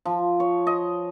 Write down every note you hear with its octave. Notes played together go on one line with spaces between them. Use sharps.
F3
C#5
D#5